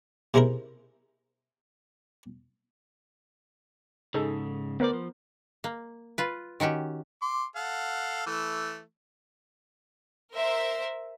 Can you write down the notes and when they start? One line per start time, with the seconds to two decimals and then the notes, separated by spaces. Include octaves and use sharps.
0.34 C3 G#3 D#4 E4 A#4
4.14 G#2 C#3 D#4 G#4 A4
4.80 D2 B3 A#4 C5 D5
4.93 F3
5.64 A#3
6.18 F4 B4
6.60 D#3 C#4 F#4 G4
7.22 C6 D6
7.56 A4 F5 F#5
8.27 E3 A3
10.34 A#4 C5 E5